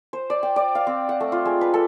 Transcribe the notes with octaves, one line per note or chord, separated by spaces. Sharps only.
C5
D5
G5
D5
F5
C4
F#5
A3
F4
G#3
B4
A4